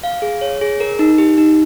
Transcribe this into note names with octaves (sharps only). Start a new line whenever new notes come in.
F5
G#4
C#5
G#4
A#4
D#4
G4
D#4